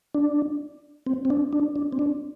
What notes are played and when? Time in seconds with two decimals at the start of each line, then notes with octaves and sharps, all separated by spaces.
0.15 D4
1.07 C4
1.25 C4
1.30 D4
1.53 D4
1.76 D4
1.92 C4
1.99 D4